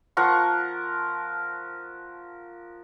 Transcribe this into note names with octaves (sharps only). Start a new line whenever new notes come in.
F3 A#4 F#5 C#6